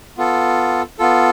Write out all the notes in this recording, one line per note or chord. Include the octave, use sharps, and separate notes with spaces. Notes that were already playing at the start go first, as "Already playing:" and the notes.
B3 F4 A4
B3 F4 A4